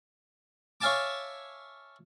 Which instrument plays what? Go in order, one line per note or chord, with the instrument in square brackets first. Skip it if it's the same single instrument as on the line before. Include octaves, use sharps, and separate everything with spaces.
[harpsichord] C#5 E5 F5 G#5 A5 D6